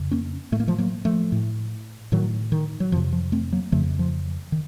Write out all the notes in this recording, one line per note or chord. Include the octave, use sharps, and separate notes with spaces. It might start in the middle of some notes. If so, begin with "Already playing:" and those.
Already playing: F2 C#3
A#3 C#4
A2 A3
A#3
F3 A3
F#3 A#3
F3 A3
A2
A2 D#3 F#3
D#3
F#3
F2 C3 F3
F3
A3 C4
F#3 A#3
F2 C#3 F3 A3
F3
D#3